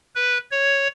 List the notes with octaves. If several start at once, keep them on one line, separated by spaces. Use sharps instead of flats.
B4
C#5